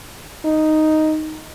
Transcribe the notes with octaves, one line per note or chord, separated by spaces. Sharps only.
D#4